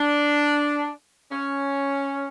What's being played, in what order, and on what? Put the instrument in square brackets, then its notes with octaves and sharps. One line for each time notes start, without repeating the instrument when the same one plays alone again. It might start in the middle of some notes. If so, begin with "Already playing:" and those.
Already playing: [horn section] D4
C#4